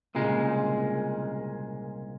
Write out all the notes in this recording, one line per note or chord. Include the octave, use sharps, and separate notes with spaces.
C2 A#2 C#3 G#3